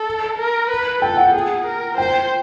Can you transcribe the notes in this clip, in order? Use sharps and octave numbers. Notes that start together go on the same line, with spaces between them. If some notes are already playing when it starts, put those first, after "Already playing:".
Already playing: A4
A#4
B4
A4 G5
F#5
G#4
A#4
C5 G5